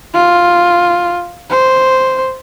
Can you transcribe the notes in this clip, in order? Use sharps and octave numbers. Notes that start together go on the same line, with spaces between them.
F4
C5